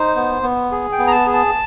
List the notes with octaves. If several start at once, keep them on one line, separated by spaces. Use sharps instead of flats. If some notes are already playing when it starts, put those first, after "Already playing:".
Already playing: D#4 C5
B3
B3
G#4
G5
B3
A#5
A5
G#4
A5